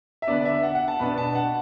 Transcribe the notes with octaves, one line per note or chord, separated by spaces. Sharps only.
E5
D3 B3 D4 D5
E5
F#5
F#5
A5
B2 B3 D4 B5
A5
F#5